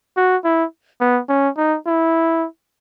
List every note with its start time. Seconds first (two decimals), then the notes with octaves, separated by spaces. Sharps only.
0.17 F#4
0.44 E4
1.01 B3
1.29 C#4
1.57 D#4
1.87 E4